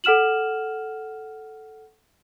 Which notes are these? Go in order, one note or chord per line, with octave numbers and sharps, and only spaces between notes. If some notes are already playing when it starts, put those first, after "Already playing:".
A4 F#5 F6 E7 F#7